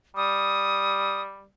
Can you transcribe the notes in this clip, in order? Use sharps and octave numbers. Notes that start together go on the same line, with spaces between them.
G3 D#6